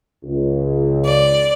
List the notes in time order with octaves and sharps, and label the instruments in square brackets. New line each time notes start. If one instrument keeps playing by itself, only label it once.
[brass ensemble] C#2
[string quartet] D5